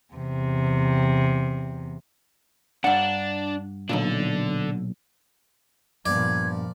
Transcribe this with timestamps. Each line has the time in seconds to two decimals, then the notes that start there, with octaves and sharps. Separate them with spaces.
0.14 E2 C3
2.84 G2 D4 F#5
3.89 B1 F2 A#2 D3 D4
6.06 G2 A#2 F3 B3 D5 G#6